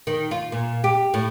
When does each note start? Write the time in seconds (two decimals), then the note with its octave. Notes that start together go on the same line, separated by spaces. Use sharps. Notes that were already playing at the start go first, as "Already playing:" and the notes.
0.07 D#3
0.31 F4
0.52 A#2
0.84 G4
1.14 A2